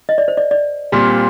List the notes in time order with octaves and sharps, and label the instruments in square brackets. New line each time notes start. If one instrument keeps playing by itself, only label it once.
[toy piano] D#5
D5
C5
D5
D5
[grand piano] A#2 G3 C4 F4